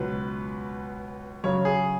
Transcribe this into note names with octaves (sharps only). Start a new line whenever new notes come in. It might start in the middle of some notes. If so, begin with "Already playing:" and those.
Already playing: C#2 B2 F#3 B4
F#2 C#3 F#3 C#5
G#4